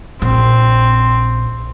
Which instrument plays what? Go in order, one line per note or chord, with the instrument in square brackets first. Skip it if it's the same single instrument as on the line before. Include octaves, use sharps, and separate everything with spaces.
[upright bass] A#1 [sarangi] C4